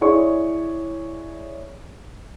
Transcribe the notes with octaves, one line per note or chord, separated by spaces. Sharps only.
E4 G#4 C#5 D5 C#6